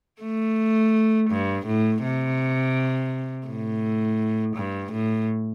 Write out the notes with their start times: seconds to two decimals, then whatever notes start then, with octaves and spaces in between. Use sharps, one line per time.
0.22 A3
1.30 G2
1.66 A2
2.03 C3
3.47 A2
4.56 G2
4.92 A2